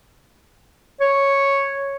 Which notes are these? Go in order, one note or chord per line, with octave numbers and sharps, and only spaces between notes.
C#5